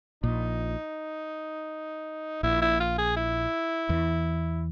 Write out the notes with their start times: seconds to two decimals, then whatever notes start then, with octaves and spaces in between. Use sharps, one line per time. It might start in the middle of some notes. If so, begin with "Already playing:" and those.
0.23 A#1 A#2 D#4
2.43 A#1 A#2 E4
2.61 E4
2.80 F4
2.98 G#4
3.17 E4
3.89 E2 E3